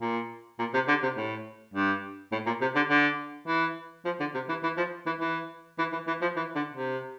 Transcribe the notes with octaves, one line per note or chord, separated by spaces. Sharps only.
A#2
A#2
C3
D3
C3
A2
G2
A2
A#2
C3
D3
D3
E3
F3
D3
C3
E3
E3
F3
E3
E3
E3
E3
E3
F3
E3
D3
C3